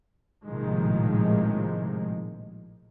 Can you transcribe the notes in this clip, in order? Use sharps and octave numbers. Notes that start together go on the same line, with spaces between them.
A#1 A2 C3 D#3 F3 G#3